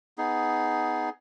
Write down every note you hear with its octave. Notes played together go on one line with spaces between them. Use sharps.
B3 D#4 G#4